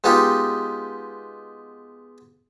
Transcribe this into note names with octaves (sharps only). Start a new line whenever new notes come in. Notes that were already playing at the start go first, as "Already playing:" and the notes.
G#3 B3 D#4 F4 G4